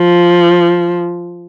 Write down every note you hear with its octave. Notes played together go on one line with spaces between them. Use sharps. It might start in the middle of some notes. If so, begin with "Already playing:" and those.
Already playing: F3